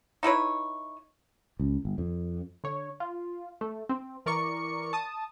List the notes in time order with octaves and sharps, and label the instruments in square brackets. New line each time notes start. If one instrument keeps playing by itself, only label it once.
[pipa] D#4 E4 B4 C#5
[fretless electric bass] C#2
G1
F2
[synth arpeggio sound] D3 C#5
F4
A3
C4
E3 A#4 D5 C#6 C#7
A5 D#6